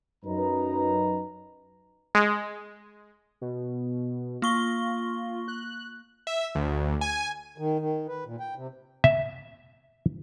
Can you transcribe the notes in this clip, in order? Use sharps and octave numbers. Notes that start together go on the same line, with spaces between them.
F#2 D#4 B4 A#5
G#3
B2
A#3 F4 C#6 G7
F#6
E5
D2
G#5
D#3
D#3
B4
A#2
G5
C3
E5